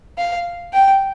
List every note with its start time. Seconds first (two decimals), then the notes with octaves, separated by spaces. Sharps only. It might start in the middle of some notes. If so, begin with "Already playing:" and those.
0.18 F5
0.74 G5